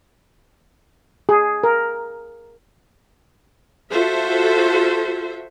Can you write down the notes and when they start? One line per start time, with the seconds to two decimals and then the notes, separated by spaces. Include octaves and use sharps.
1.29 G#4
1.64 A#4
3.92 F4 F#4 A4 C5 E5